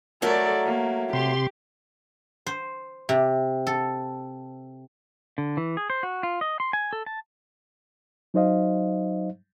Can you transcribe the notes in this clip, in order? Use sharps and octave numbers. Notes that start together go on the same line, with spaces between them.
F#3 A3 A4 A#4 D5
A#3
C3 G4 C6
C5
C3
A4
D3
E3
G#4
C5
F#4
F4
D#5
C6
G#5
A4
A5
F#3 D#4 C5 D#5 F5